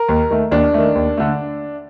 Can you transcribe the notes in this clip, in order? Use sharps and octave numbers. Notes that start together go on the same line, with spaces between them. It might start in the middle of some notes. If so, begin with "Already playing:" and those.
Already playing: A#4
D#2
D#3 A3
D#2 D4
D#3 A3
D#2
D3 A3